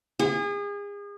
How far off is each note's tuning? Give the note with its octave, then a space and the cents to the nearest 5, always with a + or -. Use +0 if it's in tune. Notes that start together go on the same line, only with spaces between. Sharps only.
G#4 -35